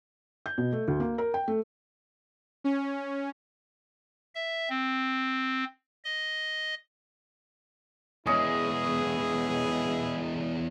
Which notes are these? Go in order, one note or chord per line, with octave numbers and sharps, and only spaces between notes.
G6
B2
A3
D2
A#3
A#4
G5
A3
C#4
E5
C4
D#5
E2 G#3 B3 C#4 E4 G#4 D#5 C#6